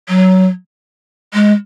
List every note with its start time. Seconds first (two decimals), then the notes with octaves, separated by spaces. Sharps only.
0.09 F#3
1.34 G#3